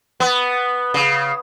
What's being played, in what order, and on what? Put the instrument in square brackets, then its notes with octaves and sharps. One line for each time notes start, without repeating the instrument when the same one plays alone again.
[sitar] B3
C#3